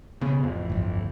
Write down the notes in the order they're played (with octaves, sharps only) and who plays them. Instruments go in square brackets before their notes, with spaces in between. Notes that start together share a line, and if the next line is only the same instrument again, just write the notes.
[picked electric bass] D1 B1 B3 [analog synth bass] C#3
[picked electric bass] A1 [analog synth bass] F2
[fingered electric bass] G1 [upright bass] D2 G2